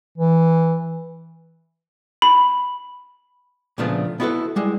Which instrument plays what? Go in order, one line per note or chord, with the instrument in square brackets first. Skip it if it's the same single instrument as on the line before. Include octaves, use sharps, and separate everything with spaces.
[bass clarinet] E3
[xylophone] B5
[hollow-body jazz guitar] A#2 C#3 F3 A3 B3 D4
B3 E4 F#4 G4 A4 B4
G3 G#3 E4